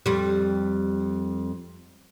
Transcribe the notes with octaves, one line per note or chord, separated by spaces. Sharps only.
F2 G3